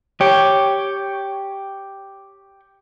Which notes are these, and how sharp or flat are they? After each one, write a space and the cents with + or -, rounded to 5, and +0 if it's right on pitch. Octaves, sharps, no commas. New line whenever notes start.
G4 +0 C#5 +0